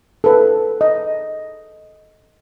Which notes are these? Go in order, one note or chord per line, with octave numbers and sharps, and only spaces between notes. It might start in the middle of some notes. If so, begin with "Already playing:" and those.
A4 B4
D#5